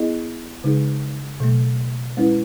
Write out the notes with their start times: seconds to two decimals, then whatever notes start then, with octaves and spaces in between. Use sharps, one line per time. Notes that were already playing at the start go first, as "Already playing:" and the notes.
Already playing: B3 E4 G#4 D#5
0.64 C#3 G#3 D#4 G#4
1.40 B2 F#3 A3
2.17 G#3 C#4 E4 B4